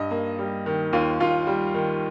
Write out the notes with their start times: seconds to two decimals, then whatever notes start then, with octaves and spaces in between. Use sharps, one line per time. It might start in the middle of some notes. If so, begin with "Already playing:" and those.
Already playing: G2 D#5
0.11 A#3
0.39 G3
0.66 D#3
0.93 D#2 F4 F5
1.20 D#2 F4 F5
1.47 G3
1.74 D#3